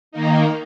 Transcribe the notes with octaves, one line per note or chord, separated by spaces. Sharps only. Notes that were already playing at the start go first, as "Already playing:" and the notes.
D#3 A#3 D#4